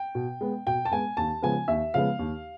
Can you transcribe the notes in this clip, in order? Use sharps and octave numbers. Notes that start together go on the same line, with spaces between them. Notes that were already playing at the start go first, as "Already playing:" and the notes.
Already playing: G5
B2
G#3 B3
B2 G5
A5
G#3 B3 G#5
D#2 A5
C#3 F3 G#3 B3 G#5
D#2 E5
C#3 F3 G#3 B3 F5
D#2